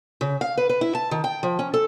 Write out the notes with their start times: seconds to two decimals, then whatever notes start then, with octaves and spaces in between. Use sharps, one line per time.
0.21 C#3
0.41 F5
0.57 B4
0.69 B4
0.81 E4
0.95 A5
1.11 D#3
1.24 G5
1.43 F3
1.59 C#4
1.74 A4